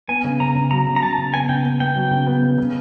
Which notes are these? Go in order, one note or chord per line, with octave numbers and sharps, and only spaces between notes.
B3 G#5
C#3
C#3 A#5
C#3
F#3 A#5
C#3
A#5
C#3 A5
C#3
B3 G#5
C#3 G5
B3
B3 G5
F#3
C#3
B3
C#3
C#3